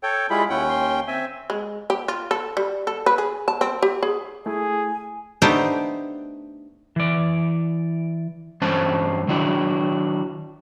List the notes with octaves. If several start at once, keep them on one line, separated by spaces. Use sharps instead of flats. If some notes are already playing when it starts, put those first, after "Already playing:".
A4 C#5 G5
G3 G#3 E4 F4 G#4 B5
D#2 C#4 E4 F#5 G5
C6
C4 E5 G#5
G#3
G4
F4
A4
G3
A4
B4
G#4
A5
C4
G4
G#4
A3 E4 G#4 G#5
A3 B3 D4 D#4 G4 C5
E3 D5
G2 E3 C#4 C5 A5
D#3 F#3 D4 E4